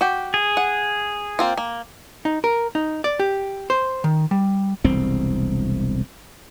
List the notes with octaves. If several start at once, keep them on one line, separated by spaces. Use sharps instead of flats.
F#4 G4
G#4
F#5
A#3 C4 F4
A#3
D#4
A#4
D#4
D5
G4
C5
D#3
G3
E1 C2 C4